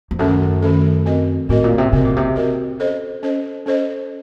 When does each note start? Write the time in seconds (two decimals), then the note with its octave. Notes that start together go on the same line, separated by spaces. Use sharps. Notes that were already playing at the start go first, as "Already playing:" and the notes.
0.11 F2
0.19 F#2 D#3 A3 C#4 A4
0.62 D#3 A3 C#4 A4
1.06 C4 F#4 A#4 D#5
1.49 A2 C4 F#4 A#4 D#5
1.64 A#2
1.78 C3
1.93 C3 C4 F#4 A#4 D#5
2.05 A#2
2.16 C3
2.36 C4 F#4 A#4 D#5
2.79 C#4 A4 C5 D#5
3.23 C#4 A4 C5 D#5
3.66 C#4 A4 C5 D#5